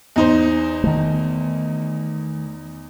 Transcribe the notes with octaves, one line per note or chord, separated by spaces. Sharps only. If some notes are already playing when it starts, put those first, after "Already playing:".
E2 D#4 C5
D#3 A3